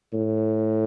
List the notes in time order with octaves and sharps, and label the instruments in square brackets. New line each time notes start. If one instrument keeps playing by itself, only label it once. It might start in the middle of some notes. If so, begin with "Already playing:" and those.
[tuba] A2